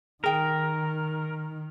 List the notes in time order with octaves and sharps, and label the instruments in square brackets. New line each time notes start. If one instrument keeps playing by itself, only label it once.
[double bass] D#3 [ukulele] G#4 G5 [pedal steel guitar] A#4